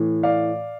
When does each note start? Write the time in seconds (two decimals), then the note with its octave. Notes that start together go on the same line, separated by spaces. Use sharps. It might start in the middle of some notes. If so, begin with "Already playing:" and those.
Already playing: A2 E3
0.23 D5 F5